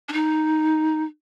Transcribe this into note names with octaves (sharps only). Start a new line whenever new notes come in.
D4
D#4